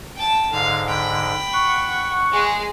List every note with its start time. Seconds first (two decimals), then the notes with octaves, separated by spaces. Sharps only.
0.16 G5 A5
0.52 G#2 D3 F5
0.89 G5 B5
1.53 F#5 C#6
2.32 G#3 G#4